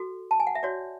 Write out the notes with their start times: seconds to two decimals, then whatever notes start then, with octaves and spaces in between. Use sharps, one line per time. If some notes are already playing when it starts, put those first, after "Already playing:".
Already playing: F#4 A4
0.31 A5
0.40 G#5
0.47 F#5
0.55 E5
0.63 F#4 C#5 D5